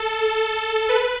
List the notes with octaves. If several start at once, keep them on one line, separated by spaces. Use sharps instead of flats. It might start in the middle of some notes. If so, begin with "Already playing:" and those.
Already playing: A4
B4